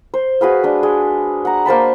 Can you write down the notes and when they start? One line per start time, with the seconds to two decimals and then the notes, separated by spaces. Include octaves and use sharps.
0.14 C5
0.41 F#4 G#4 B4 F5
0.64 G#3 D4
0.83 G#3
1.45 F#5 A#5
1.66 A#3 C5 A5 B5